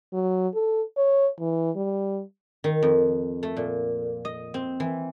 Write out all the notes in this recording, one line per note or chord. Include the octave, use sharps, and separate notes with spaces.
F#3
A4
C#5
E3
G3
D#3
F2
A3
A#2
D#5
C4
E3